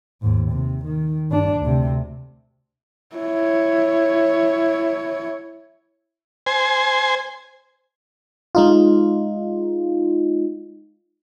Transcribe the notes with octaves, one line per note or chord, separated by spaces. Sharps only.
D#2 G#2
C3
D#3
G2 D4
D2 C3
E4 C#5
C5 G#5
G#3 D#4 F4